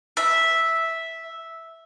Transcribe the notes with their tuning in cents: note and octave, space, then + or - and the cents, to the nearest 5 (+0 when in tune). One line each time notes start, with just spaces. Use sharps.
E5 -5